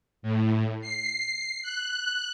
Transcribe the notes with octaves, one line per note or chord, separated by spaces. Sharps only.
A2
C7
F#6